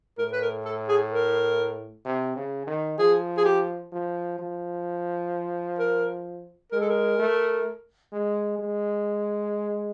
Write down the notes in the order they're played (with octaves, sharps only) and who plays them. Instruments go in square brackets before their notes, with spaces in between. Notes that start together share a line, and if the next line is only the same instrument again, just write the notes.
[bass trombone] A2 [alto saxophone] A#4
[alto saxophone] B4
A#4
A4
G#4
A#4
[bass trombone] C3
C#3
D#3
[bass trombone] F3 [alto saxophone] G#4
[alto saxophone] G#4
G4
[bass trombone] F3
F3
[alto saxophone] A#4
[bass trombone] G#3 [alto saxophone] A#4
[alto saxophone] A4
A#4
[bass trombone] A3
G#3
G#3